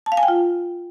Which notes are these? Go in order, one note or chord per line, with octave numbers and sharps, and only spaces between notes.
A5
F5
G#5
G5
F4